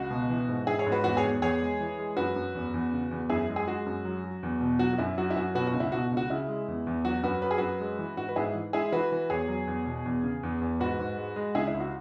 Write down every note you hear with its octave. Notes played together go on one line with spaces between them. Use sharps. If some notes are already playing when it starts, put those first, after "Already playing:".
Already playing: C#2 F#4
B2
E3
G#2
G#2 E4 G#4
G#4 C#5
G#2
F#4 B4
E2 F#4 B4
G#4 C#5
E2
E2 G#4 C#5
G#3
E3
G#3
F#2 F#4 B4
F#2
E2
E2
C#3
E2
F#2 E4 G#4
G#3
G#4
G#3 F#4
F#2
F#3
F#3
E2
B2
F#3 F#4
F#4
F#2 E4
F#3 F#4
E4
F#2 F#4
B2 F#4 B4
F#4
C#2
E4
B2 F#4
C#2
F#4
C#3 E4
G#3
E2
E2
F#3 F#4
F#2 F#4 B4
F#3 B4
G#4
F#2 F#4 B4
G#3
E3
G#2 F#4
B4
G#2 E4 G#4
E3
G#3 E4 G#4
E3 F#4 B4
E3
E2 G#4 C#5
F#3
E2
B2
E2
C#3
E2
E2
G#2 F#4 B4
G#2
G#3
G#3
C#2 E4 G#4
E4
C#2
F#4